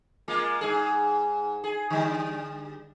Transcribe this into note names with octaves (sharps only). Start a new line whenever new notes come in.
G#3 A#3 F4
G#2 G#4
G#4
D3 G3